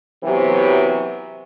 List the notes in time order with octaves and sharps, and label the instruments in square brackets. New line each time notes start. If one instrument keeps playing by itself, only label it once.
[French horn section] C3 E3 F#3 B3 G4